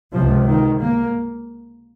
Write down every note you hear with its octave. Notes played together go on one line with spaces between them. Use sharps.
C#2 C3 F3
D#3
A#3